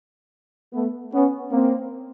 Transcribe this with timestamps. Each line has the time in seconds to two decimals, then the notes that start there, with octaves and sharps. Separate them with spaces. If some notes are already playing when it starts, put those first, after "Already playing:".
0.73 A3 B3
1.13 B3 C#4
1.51 A#3 C4